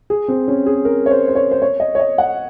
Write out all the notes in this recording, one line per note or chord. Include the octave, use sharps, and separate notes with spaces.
G#4
C4
C#4
G#4
A#4
C#5
C5
C5
C#5
C5
C#5
D#5
C#5
D#5
F#5